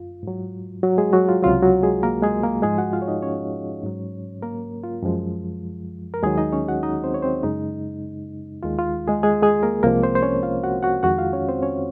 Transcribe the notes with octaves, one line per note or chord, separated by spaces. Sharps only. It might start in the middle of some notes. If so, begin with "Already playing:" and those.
Already playing: F#2 F4
G#2 F#3
F#3 F#4
G#3 G#4
F#3 F#4
F4
C#2 C3 F#3 F4
F#3 F#4
G#3 G#4
A#3 A#4
G#3 G#4
A#3 A#4
G#2 F3 G#3 G#4
F#4 F#5
F4 F5
C#5
D#4 D#5
C#4 C#5
G#2 F#3
A#3 A#4
F4
F#2 F3 G#3
A#4
D#2 D#3 F#3 G#3 G#4
D#4 D#5
C#4 C#5
F#4 F#5
D#4 D#5
C4 C5
C#5
C4 C5
F#2 C#3 G#3 D#4
D#2 D#3 G#3 F4
F4
G#3 G#4
G#3 G#4
G#3 G#4
A#3 A#4
C2 C3 F3 G#3 A#3 A#4
C4 C5
C5
C#4 C#5
F4 F5
F#4 F#5
F#4 F#5
F2 D#3 G#3 F#4 F#5
F4 F5
C#4 C#5
C4 C5
C#4 C#5